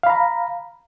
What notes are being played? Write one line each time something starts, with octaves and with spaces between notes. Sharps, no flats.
F5 A#5 B5